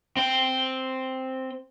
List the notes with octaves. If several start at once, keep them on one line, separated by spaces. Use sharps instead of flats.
C4 G5